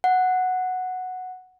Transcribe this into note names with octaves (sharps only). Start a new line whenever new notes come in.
F#5